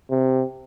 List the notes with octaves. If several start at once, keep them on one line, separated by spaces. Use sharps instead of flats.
C3